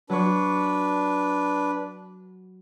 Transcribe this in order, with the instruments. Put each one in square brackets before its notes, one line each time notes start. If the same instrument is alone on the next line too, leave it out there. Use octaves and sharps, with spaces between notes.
[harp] F#3 C#6 [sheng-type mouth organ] D4 B4